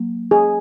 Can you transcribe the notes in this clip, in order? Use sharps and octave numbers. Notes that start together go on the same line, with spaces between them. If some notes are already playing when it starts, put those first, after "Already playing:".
Already playing: F#3 A#3
G#4